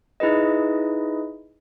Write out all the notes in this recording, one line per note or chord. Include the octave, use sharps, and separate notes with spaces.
D#4 E4 G#4 B4 D#5